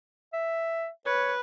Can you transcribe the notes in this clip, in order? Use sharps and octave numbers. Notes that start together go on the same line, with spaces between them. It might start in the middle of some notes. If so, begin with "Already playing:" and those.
E5
B4 C#5